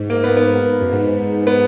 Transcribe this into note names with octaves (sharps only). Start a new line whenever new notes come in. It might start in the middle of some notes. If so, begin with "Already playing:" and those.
Already playing: G#2
A#3
B3
B3
F#2
G#2
B3